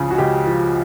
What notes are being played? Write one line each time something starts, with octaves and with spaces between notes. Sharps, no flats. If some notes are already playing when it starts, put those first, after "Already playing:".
Already playing: C#2 C#3 F3 G#4
F#4
C#2 G4
F3